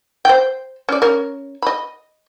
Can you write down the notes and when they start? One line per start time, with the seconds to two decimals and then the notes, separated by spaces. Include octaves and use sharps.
0.25 C5 G5
0.89 C#4 D5
1.02 C#4 A#4
1.62 D#5 B5